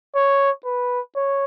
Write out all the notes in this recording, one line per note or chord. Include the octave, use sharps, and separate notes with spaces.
C#5
B4
C#5